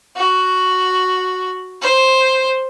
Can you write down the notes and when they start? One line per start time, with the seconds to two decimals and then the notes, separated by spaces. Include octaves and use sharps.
0.17 F#4
1.82 C5